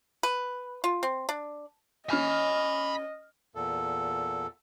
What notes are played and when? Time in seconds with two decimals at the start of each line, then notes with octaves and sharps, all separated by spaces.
0.23 B4
0.84 F4
1.03 C4
1.29 D4
2.10 C#4 D#5 G#5 B5 F6
3.55 E2 A#2 A4